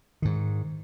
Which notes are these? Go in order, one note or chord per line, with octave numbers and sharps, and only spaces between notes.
G#2 D#3